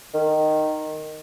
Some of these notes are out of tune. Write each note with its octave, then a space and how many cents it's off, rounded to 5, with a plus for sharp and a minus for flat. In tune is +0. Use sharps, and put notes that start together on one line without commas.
D#3 -10